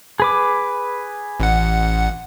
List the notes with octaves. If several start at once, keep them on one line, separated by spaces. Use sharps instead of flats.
G#4 B4 D6
A1 F#5